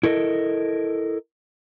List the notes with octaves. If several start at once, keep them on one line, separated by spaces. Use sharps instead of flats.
E4 A4 A#4 D#5